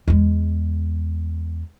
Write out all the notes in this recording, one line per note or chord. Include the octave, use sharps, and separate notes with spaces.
E2 G#3